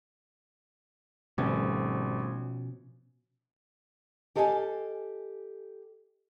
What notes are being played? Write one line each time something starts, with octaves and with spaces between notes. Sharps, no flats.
G#1 B2 F3 G3 A3 C#4
G4 A4 D#5 F5 F#5 G#5